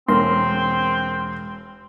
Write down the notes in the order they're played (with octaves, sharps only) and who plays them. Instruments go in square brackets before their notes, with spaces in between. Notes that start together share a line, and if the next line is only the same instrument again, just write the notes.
[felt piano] E1 A#4 [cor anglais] C4 [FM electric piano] C6